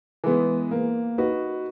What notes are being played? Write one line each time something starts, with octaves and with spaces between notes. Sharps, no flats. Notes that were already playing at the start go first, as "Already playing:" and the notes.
E3 G#3 B3
A#3
D#4 F#4 B4